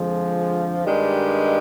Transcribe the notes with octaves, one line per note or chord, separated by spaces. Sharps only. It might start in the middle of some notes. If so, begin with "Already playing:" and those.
Already playing: F2 D3 F3 G#3
G2 D#3 G#3 D4 G4